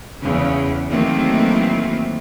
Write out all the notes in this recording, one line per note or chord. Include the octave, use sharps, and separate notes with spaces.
E2 C#3
D#3 E3 F#3 A3 A#3 C4